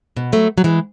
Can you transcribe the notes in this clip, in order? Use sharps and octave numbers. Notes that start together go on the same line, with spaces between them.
B2
F#3 A3
F#3
E3 G#3